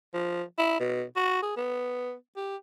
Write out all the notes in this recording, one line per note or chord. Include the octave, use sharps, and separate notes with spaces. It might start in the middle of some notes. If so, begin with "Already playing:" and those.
F3
E4
B2
F#4
G#4
B3
G4